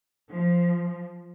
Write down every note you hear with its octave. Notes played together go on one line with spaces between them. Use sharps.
F3